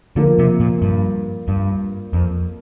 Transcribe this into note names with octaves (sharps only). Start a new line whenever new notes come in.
D3 F3 A#3 F4 A#4
C3
A#2
G2
G2
F2